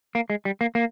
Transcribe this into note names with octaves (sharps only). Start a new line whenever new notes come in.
A#3
G#3
G3
A#3
A#3